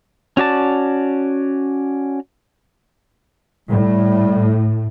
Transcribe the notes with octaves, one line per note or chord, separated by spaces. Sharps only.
C#4 F#4 D5 A5
A2 G3